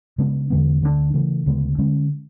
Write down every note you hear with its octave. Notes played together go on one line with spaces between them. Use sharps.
C#3 G#3 B3 D4
E2 D3 G#3 B3
D2 D3 G#3 D4
C#3 E3 A3
D2 C#3 G#3 B3
D3 G#3 C#4